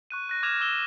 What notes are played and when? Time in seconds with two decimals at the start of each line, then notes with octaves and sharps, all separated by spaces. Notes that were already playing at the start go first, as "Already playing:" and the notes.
0.10 C#6 F#6 D#7
0.29 F#6 A#6
0.43 D6 F6 G#6 A#6 E7 F7
0.61 D6 E6 E7 G7